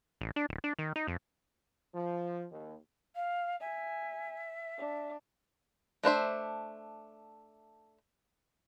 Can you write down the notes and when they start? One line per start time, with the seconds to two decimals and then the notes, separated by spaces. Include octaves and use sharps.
0.21 A1
0.36 D4
0.49 D1
0.64 D4
0.79 D#3
0.96 D#4
1.07 F2
1.94 F3
2.51 D#2
3.15 F5
3.60 E5 G#5
4.78 D4
6.03 A3 D4 C5 E5